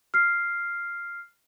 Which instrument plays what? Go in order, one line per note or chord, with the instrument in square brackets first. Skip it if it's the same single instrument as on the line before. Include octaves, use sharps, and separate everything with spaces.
[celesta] F6 C7